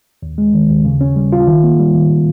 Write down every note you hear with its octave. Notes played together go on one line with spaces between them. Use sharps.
D#2
G#3
D#3
D#2
C#3
C#4
G3
F4
D#3
A#3
G3
D#3